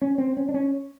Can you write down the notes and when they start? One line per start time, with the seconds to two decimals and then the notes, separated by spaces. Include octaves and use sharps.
0.02 C#4
0.18 C4
0.37 C#4
0.49 D4
0.54 C#4